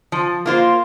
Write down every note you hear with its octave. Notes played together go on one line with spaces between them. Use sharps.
F3
A#3 F4 C5